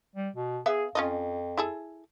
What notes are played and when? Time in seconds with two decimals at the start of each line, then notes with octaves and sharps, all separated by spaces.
0.15 G3
0.36 B2
0.66 B3 G#4 E5 F5
0.95 F2 C#4 F4 D#5
1.57 E4 G#4 A4